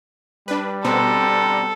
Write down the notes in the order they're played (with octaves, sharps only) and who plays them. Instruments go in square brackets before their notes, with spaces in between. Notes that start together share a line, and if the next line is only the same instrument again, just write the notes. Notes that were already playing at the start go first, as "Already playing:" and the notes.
[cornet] G3 [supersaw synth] D4 B4
[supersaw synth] B2 B3 C4 [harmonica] D3 A#5 C6 [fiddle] A4